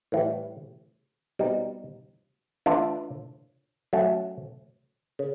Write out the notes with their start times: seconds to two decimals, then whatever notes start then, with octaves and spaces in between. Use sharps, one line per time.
0.12 A2 E3 G3
1.39 B2 G3 C4 D#4
2.66 E3 A3 D4 F4
3.93 F#3 A3 C#4
5.19 C#3